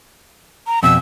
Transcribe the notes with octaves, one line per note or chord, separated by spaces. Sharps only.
A#5
F2 B2 E6